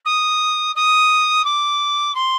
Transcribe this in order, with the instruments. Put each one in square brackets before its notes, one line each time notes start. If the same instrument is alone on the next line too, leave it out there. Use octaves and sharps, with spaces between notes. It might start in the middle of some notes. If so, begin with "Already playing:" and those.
[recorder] D#6
D#6
D6
C6